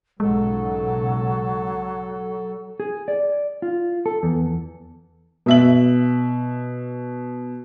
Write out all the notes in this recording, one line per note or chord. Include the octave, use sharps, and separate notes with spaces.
B1 G#2 C#3 F#3 G#3 A4
G#4
D5
F4
A4
E2
B2 E5 F#7